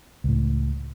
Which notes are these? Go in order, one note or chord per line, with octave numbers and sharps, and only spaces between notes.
C#2 A2